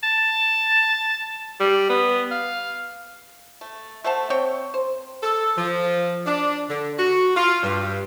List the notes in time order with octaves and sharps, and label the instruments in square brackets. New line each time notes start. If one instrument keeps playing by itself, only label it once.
[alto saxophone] A5
G3
B3
F5
[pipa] A3
A3 C5 F#5 A5
C4 C#5 G5
C5
[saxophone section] A4
F3
D4
D3
F#4
F4
G2